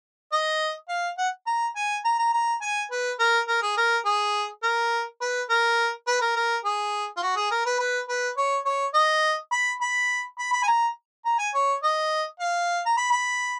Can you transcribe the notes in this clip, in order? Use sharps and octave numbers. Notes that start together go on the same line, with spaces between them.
D#5
F5
F#5
A#5
G#5
A#5
A#5
A#5
G#5
B4
A#4
A#4
G#4
A#4
G#4
A#4
B4
A#4
B4
A#4
A#4
G#4
F4
F#4
G#4
A#4
B4
B4
B4
C#5
C#5
D#5
B5
B5
B5
B5
G#5
A#5
A#5
G#5
C#5
D#5
F5
A#5
B5
B5